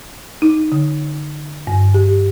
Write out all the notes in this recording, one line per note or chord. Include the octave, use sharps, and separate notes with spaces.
D#4
D3
G2
G4